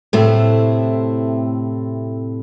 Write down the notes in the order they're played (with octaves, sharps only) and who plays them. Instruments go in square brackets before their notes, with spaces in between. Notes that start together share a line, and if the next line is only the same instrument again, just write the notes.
[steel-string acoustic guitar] A2 C3 A3 C4 E4